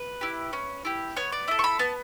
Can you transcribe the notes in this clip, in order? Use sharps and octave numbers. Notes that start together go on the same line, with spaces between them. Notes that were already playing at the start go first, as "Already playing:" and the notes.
Already playing: B4
E4 G4
C#4
E4 G4
B3 C#5
D5
E4 A4 E5
C#6
B5
B3 A5